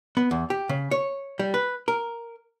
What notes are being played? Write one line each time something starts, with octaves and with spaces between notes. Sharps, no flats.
B3
E2
G4
C#3
C#5
G3
B4
A#4